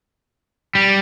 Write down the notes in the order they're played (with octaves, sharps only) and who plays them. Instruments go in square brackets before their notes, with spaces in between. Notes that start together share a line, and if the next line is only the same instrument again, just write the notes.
[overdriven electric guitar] G3